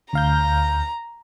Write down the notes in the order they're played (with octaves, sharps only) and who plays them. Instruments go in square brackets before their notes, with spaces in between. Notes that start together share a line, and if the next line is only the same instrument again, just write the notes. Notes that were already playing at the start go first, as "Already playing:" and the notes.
[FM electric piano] D2 F5 G6 [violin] A#5